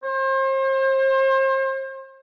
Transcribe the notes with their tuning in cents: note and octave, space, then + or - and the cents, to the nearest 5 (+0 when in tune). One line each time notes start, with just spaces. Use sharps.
C5 +35